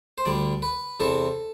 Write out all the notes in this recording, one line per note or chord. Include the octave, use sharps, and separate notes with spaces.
C5
D2 D3 G3 D5
B4
E2 C3 E3 A4